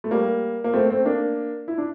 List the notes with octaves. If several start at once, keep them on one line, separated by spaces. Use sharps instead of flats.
A3
G3 A#3
A#3
A3 C4
A3 C4
A#3 D4
E4
D4